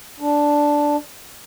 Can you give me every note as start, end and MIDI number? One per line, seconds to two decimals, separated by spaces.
0.20 0.96 62